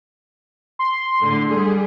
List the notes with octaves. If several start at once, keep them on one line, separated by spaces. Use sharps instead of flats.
C6
A2 D3
G3 G#4